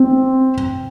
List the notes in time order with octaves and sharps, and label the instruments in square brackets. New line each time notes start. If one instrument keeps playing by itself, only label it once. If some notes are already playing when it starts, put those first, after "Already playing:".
Already playing: [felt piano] C4